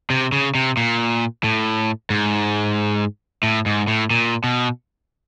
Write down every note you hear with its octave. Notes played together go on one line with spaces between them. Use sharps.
C3
C#3
C3
A#2
A2
G#2
A2
G#2
A2
A#2
B2